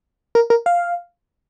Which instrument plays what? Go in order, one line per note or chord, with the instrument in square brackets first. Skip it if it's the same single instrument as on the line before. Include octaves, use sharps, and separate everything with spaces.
[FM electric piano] A#4
A#4
F5